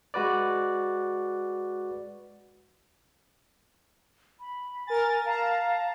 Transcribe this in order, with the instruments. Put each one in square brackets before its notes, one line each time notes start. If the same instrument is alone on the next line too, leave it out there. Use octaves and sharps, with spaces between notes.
[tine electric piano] G#3 F#4 B4 D5
[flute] B5
[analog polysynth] A#4 A6 [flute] G#5
[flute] F5 [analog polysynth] A5 A#5